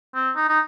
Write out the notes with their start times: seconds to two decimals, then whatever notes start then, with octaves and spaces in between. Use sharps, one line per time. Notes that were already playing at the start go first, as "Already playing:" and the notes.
0.15 C4
0.36 D#4
0.49 D#4